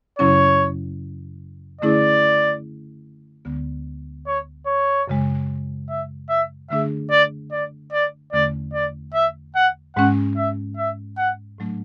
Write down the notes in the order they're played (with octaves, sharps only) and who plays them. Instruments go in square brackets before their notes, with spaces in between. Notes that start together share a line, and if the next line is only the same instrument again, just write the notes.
[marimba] F#2 C#3 F#3 C#4 E4 [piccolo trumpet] C#5
[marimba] D3 A3 C#4 E4 G#4 [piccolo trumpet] D5
[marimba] D2 D3 G#3 B3
[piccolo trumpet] C#5
C#5
[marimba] F#2 C#3 G#3
[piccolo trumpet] E5
E5
[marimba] D3 A3 D4 G#4 [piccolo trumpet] E5
[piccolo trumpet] D5
D5
D5
[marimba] E2 D3 A3 C#4 [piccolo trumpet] D5
[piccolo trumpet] D5
E5
F#5
[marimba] G#2 G#3 C#4 [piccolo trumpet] F#5
[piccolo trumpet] E5
E5
F#5
[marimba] A2 F#3 A3 D4